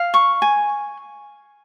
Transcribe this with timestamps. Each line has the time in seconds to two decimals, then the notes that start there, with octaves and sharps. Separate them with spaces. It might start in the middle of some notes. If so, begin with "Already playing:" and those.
Already playing: F5
0.14 C#6
0.42 G#5